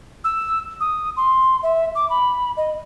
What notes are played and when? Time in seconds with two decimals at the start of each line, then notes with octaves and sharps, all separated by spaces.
0.24 E6
0.80 D#6
1.17 C6
1.63 E5
1.95 D6
2.10 B5
2.57 D#5